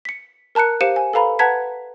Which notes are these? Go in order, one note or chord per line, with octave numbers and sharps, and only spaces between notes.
B6 C#7
A#4 A5 A#5 F#6 C#7
G4 C5 F5 C#7 D#7 E7
G#5
A4 B4 F5 A#5 B5
B4 F#5 A5 A#5 G#6 B6